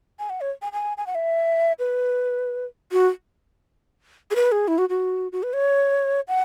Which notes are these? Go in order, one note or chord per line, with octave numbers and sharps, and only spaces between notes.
G#5
F#5
C#5
G#5
G#5
G#5
F#5
E5
B4
F#4
G#4
B4
G#4
E4
F#4
F#4
F#4
B4
C#5
F#5